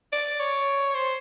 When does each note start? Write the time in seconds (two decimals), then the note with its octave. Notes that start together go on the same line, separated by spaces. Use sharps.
0.13 D5
0.40 C#5
0.94 C5